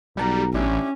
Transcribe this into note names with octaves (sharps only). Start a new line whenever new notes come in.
B1 G3 F#5 A5 A#5
A1 C#4 D4 E4 G4